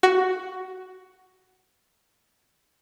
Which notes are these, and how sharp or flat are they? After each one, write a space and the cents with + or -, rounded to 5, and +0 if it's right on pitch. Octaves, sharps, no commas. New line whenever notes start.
F#4 +10